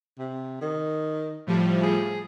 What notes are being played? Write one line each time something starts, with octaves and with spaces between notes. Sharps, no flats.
C3
D#3
A2 F3 G3
G#4